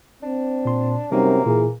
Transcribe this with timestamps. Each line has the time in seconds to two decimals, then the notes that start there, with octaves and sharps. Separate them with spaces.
0.23 C4 D4
0.65 A#2 C6
1.12 F#2 C3 G3 A#3 D#4 F#4
1.46 A#2 E3 G#4